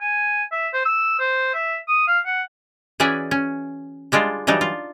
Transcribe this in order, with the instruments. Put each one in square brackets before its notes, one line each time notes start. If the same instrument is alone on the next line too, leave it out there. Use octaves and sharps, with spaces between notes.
[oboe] G#5
E5
C5
E6
C5
E5
D#6
F5
F#5
[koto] E3 C#4 F#4 G#4 D5 E5
C#4
G3 G#3 D4 F4
E3 F#3 G3 D4 D#4
F4